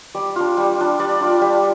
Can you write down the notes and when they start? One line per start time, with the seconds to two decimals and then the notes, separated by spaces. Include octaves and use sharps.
0.15 G3 D5
0.36 D4 F4
0.57 G3
0.78 D4 F4
0.99 G3 D5
1.20 D4 F4
1.41 G3